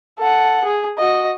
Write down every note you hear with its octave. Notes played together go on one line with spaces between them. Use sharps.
A4 F#5
G#4
F#4 D#5